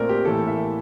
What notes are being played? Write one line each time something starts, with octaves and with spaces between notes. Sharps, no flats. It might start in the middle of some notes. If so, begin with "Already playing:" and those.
Already playing: A#2 A3 C4 A#4 D5
G4
A2 E3 A#3 A4
E5